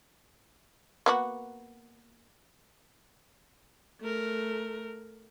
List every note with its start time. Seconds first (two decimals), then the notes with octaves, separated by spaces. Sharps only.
1.06 A#3 B3 F#4
4.01 A3 A#4